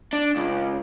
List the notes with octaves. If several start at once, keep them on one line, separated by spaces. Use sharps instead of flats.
D4
C#2